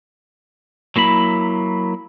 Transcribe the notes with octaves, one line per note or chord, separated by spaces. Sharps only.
F#3 A#3 E4 B5